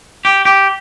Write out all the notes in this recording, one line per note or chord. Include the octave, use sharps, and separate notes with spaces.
G4
G4